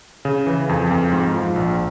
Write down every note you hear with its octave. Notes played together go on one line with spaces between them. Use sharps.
C#3
E3
F2
F2
G#2
F3
A#1